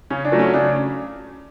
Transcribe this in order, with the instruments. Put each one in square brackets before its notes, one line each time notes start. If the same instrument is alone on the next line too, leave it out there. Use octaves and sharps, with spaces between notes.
[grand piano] C#3 C#4
D4
F#3 A3
C#4
C#3 D4